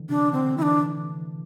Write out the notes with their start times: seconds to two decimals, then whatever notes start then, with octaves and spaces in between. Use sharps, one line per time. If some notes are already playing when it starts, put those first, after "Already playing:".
Already playing: D3 E3
0.09 C3 D4
0.33 D3 C4
0.57 E3 D4 E4